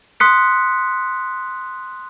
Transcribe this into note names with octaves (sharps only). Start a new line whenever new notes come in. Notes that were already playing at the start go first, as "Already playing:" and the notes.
C6 D#6 F#6 B6 C#7